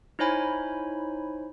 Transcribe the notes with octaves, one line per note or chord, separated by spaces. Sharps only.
D#4 E4 C5 C#5 G#5 B5